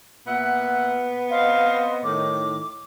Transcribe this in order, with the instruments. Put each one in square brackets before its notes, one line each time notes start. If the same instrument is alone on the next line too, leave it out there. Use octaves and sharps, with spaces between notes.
[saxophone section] A#2 E5 F#5 [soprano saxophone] B3
[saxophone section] C4 C5 D#5 [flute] F5
[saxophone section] A2 D#3 [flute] D6